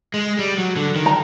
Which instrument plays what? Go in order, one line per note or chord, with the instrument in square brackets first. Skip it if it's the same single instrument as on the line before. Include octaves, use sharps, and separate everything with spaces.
[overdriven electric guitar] G#3
G3
F#3
D3
D#3
[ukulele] A#5